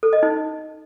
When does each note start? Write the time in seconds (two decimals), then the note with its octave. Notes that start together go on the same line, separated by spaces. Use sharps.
0.03 A4
0.13 D#5
0.23 D#4